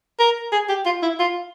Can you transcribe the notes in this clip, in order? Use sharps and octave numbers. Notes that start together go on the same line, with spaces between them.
A#4
G#4
G4
F4
E4
F4